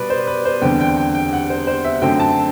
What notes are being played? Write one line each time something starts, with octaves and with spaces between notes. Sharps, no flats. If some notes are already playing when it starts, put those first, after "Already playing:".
Already playing: B2 G3 B4 D5
C5
B4
C5
E2 D3 G3 C4 G5
G5
G5
G5
F#5
C5
C5
E5
F#2 D3 F#3 A3 C4 G5
A5